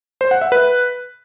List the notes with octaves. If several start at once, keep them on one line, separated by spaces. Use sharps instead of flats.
C5
F#5
E5
B4